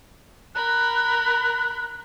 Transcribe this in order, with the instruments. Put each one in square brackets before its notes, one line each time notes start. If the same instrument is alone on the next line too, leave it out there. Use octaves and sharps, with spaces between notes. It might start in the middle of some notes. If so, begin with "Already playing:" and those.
[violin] A#4 B5 [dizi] F#6